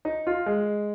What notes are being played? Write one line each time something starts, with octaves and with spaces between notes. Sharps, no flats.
D#4
F4
G#3